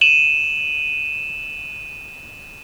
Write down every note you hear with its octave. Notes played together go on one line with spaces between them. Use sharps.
D#7 E7 F#7